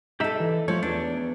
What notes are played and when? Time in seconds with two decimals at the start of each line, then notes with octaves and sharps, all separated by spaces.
0.20 D#4 G4 A4 E5
0.40 E3
0.68 F3 A3 C#5
0.83 E2 D4